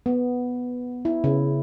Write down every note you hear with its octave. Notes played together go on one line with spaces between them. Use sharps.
B3
E4
C#3